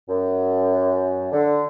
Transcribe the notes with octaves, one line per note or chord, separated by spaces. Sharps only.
F#2
D3